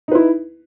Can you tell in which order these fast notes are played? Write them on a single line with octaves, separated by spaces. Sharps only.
D#4 B4 E4